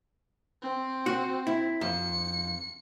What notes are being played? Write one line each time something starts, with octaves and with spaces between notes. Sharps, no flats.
C4
F#4
E4
F2 C#7